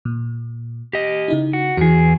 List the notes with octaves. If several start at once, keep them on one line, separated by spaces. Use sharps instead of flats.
A#2
G4 D#5
C#3 D#4 E4
F#4
E2 E3 F#4 G#4